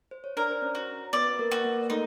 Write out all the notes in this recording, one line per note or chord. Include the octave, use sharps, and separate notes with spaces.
C5
C#5
D4 A#4 D5
C5
C#4 C#5
F#4
B3 B4 D5
B4
A#3 A#4
F#4 B4
A#3 A#4
A3 D#4 A4